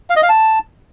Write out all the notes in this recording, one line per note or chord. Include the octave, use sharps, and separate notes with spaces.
F5
D#5
F5
A5